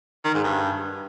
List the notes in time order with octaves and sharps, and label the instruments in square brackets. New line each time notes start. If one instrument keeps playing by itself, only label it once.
[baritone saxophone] D#3
G#2
G2